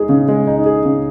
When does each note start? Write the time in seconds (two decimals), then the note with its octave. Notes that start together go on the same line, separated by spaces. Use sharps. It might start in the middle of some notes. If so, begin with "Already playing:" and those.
Already playing: G#3 D#4 G#4
0.09 C#3
0.28 G#3
0.47 D#4
0.66 G#4
0.85 C#3